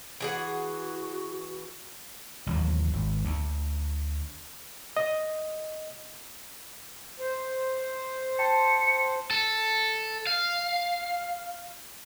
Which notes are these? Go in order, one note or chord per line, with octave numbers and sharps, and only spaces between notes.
E3 F#4 G#4 F#5
A1 D#2 F#3
G#1
D2
D#5
C5
G5 A5 C6 C#7
A4
F5